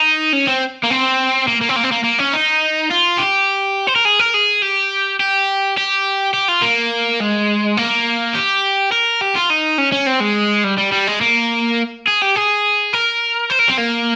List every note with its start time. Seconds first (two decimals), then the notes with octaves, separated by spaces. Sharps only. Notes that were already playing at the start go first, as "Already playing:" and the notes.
Already playing: D#4
0.33 C#4
0.47 C4
0.83 A#3
0.90 C4
1.48 A#3
1.61 A#3
1.69 C4
1.76 A#3
1.84 C4
1.92 A#3
2.04 A#3
2.19 C#4
2.34 D#4
2.91 F4
3.19 G4
3.87 C5
3.96 A#4
4.05 G#4
4.19 A#4
4.34 G#4
4.62 G4
5.20 G4
5.77 G4
6.34 G4
6.49 F4
6.62 A#3
7.21 G#3
7.77 A#3
8.35 G4
8.92 A#4
9.21 G4
9.35 F4
9.50 D#4
9.78 C#4
9.92 C#4
10.07 C4
10.20 G#3
10.64 G3
10.78 G3
10.92 G3
11.07 G#3
11.21 A#3
12.07 G#4
12.21 G4
12.35 G#4
12.93 A#4
13.50 C5
13.60 A#4
13.70 C4
13.78 A#3